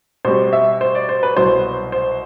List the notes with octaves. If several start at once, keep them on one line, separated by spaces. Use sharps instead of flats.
B2 G3 C4 C5
E5
C5
D5
C5
B4
C2 B2 F#3 B3 C5
C5